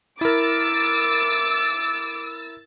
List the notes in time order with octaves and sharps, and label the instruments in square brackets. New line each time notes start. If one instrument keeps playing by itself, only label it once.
[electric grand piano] E4 A#4 [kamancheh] D6 [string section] E6 A6